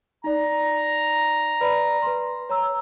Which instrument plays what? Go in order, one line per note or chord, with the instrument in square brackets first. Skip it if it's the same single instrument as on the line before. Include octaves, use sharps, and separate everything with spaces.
[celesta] D#4 D5 [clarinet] A#5
[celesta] B4 D5 B5
B4 C6
C#5 A#5 E6